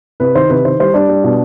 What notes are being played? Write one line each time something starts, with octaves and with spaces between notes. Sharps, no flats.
C3 B4
D#3 C5
C3 B4
D#3 C5
G3 C5
G3 D4 D5
G3
B2